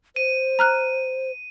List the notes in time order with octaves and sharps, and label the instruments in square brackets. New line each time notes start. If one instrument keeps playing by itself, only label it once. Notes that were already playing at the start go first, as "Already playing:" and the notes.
[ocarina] C5 [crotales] D#7
[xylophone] A#5 F6 F#6